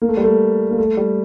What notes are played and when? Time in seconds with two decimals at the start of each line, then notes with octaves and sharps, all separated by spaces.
0.02 A#3
0.09 A3
0.17 G3
0.24 A3
0.71 A#3
0.78 A3
0.97 G3